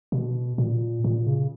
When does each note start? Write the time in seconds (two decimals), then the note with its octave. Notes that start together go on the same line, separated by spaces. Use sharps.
0.12 B2
0.58 A#2
1.04 A#2
1.27 C#3